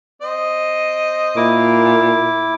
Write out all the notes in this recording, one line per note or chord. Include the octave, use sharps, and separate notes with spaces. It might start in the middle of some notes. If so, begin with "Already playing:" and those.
C4 D#5
A#2 E4 D6